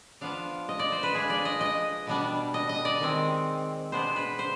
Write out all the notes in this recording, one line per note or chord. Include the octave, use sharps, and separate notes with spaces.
F3 B3 D4 F5
D#5
D5
C5
B4
F3 G#3 D4 G#4
D5
D#5
D#5
B2 G3 B3 D4
D#5
D#5
D5
D#3 G#3 C4
B2 G#3 B3 D4 C5
B4
C5